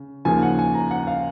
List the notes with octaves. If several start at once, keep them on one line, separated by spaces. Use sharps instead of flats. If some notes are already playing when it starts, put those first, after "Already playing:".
Already playing: C#3
D#2 C#3 F3 G#5
F#5
G#5
A#5
F#5
F5